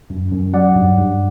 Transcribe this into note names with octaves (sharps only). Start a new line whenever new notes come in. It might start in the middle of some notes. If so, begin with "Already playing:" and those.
F#2
F#2
F#3 D5 F#5
G2
G2